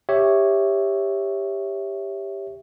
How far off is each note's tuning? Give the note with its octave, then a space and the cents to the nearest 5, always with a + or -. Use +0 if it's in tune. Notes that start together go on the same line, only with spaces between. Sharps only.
G4 +10 C#5 +0 E5 +0